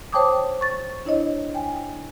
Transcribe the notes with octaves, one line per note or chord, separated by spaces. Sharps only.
C5 C#5 G5 A5 D6 D#6
C#6 A6
D4 E4 C#5 D#5
G5 G#5